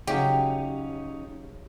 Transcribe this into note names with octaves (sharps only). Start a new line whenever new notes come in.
C#3 F#3 C#4 D#4 G4